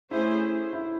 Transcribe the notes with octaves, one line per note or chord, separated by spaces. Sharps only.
A3 C#4 E4 G#4 C5
E4